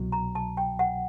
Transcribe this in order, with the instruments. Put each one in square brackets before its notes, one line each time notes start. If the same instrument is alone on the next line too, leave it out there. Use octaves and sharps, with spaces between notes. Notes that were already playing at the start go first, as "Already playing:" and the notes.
Already playing: [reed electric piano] C2 B2 F#3
[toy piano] A#5
A5
G5
F#5